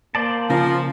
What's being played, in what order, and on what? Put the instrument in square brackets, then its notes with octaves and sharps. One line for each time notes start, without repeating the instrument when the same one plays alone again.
[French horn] A#3 [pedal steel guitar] C5 D5 A5
[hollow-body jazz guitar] C#3 [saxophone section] F3 [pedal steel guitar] A#4